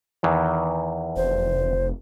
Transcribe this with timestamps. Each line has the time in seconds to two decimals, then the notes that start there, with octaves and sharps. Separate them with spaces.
0.23 E2 D#3 E3
1.16 F1 C5